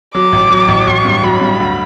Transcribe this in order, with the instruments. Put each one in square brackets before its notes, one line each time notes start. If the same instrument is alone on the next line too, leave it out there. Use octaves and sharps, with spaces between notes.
[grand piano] F#3 [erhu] D6
[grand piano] A1
F#3
A1
[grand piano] A1 [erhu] C#6
[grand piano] G2
[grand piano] F#3 [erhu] B5
[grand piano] G2
D2